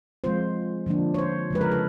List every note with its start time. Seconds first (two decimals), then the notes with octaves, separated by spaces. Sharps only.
0.24 F3 G#3 C4 F4 C5
0.86 D3 F3 A#3 D4
1.14 C#5
1.18 C5
1.50 C#3 F3 G#3 B4
1.61 A#4
1.71 A4